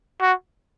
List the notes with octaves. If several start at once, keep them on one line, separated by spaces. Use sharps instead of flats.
F#4